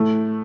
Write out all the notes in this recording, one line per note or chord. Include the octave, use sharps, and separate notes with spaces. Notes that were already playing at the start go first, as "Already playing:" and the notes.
Already playing: A2 A3